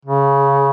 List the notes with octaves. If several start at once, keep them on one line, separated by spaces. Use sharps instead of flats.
C#3